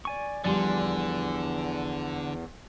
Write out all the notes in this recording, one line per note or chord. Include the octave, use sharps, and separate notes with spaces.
D5 G#5 C#6
E2 D3 F3 G3 D5 G#5 C6